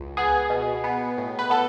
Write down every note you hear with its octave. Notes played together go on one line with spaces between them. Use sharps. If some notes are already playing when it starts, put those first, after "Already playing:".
Already playing: C#2
B3 G#4
B2
B3
A2
B4
B3 A4